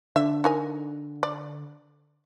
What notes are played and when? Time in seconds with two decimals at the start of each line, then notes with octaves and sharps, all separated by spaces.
0.16 D3 E5
0.44 D#4 A#4 G#5
1.23 D5